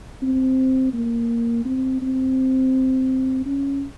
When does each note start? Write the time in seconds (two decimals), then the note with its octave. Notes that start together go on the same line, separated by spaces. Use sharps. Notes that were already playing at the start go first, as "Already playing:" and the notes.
0.22 C4
0.93 A#3
1.65 C4
2.01 C4
3.46 C#4